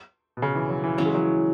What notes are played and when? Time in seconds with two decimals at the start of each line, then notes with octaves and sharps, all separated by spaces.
0.37 B2
0.42 C#3
0.55 E3
0.69 F#3
0.84 E3
0.97 C#3 E3 F#3 C#4 E4
1.06 G#3
1.15 F#3